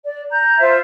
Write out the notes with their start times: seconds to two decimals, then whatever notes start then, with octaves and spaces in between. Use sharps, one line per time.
0.05 D5
0.31 A#5 G6
0.59 F4 C5 E5 F5